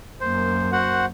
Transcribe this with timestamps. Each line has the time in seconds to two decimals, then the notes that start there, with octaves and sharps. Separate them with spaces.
0.21 F#2 A#3 C5
0.72 F#4 C5 F#5